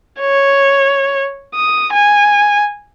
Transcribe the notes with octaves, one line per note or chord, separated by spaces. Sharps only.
C#5
D#6
G#5